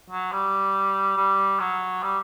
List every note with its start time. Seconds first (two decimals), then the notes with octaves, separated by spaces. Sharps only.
0.10 F#3
0.32 G3
1.17 G3
1.60 F#3
2.03 G3